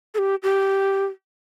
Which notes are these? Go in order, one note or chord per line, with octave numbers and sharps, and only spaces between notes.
A4
G4
G4